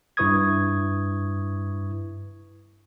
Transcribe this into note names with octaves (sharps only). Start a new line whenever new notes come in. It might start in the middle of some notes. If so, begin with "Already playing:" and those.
G2 E4 B4 C#6 D#6 G#6